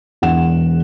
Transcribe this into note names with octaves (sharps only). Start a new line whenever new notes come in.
E1 E2 F#5 E7